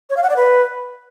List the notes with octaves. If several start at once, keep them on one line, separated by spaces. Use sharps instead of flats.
C#5
F5
F#5
D5
B4